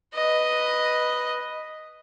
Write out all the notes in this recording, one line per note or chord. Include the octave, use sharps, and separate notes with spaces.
B4 D#5